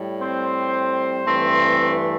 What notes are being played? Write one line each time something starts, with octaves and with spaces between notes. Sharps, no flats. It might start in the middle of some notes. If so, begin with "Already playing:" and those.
Already playing: A2 G3
C4 C5
G2 E3 A3 C4